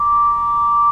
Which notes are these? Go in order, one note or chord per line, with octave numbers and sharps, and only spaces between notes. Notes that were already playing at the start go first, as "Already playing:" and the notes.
Already playing: A#5 D6